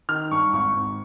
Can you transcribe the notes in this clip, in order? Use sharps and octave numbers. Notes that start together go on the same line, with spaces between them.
D#3 F6
G2 C#6
G#1 C#6
G#1